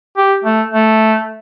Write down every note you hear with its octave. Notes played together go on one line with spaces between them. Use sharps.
G4
A3
A3